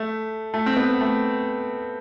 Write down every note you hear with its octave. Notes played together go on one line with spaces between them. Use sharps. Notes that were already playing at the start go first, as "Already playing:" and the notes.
Already playing: A3
A3
C4
B3
A3